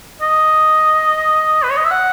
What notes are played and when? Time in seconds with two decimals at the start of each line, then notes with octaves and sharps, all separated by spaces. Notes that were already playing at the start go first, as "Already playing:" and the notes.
0.21 D#5
1.63 B4
1.70 C#5
1.77 D#5
1.85 E5
1.91 F#5